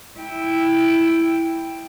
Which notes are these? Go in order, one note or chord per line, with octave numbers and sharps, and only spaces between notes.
E4 G5